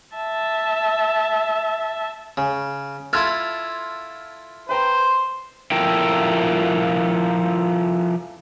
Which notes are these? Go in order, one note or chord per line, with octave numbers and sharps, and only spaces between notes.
E5 A5
C#3
E4 F4 A4 C6 F6 G#6
B4 C5 G5 A#5
F3 E4 F4 A4 A#4 G5